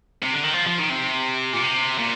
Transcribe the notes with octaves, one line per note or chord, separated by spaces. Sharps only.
C3
D3
D#3
F3
F3
D#3
C3
A#2
C3
A#2